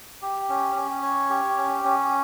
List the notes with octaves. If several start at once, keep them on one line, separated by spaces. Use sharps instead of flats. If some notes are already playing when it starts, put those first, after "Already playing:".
G4
C#4
C#4
C#5
G4
C#4
C#4